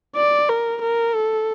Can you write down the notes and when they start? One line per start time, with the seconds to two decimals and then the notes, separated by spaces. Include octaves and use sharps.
0.16 D5
0.49 A#4
0.82 A#4
1.15 A4